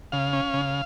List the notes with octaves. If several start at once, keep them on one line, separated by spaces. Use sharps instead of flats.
C#3 F5
C#4
C#3